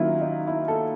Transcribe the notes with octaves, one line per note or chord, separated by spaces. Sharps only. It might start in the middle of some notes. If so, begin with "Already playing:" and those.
Already playing: D#3 F#3 A#3 C#4 E4 F4
D#4
E4
A4